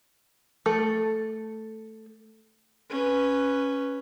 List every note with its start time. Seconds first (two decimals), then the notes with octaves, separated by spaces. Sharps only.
0.66 A3 A4
2.90 C#4 B4